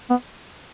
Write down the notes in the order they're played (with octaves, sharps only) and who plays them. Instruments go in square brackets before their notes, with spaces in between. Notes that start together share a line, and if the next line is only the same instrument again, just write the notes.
[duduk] B3